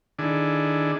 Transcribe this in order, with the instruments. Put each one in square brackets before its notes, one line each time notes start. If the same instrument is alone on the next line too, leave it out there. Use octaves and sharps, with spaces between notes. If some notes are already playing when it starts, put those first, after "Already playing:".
[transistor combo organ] D3 D#3 D4 E4 G#4